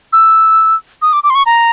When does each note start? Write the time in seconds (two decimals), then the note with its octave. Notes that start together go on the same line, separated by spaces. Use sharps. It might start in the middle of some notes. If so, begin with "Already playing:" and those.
0.13 E6
1.02 D#6
1.13 D6
1.24 D6
1.30 C6
1.35 C#6
1.46 A#5